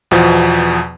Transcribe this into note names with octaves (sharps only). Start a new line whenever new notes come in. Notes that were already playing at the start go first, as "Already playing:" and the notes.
E2 B2 F3